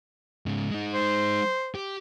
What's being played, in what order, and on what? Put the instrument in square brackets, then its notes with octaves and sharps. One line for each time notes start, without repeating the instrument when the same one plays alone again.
[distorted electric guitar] G#2 C#3
G#3 D#4
[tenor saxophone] C5
[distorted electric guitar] G4